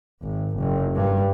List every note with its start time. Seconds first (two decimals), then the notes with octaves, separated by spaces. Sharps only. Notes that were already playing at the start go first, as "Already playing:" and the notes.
0.22 G#1
0.57 F#1
0.95 G2